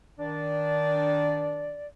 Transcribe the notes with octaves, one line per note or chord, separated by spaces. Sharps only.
D#3 D4 D5